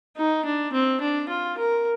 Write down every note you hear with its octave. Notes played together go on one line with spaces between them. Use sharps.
D#4
D4
C4
D4
F4
A#4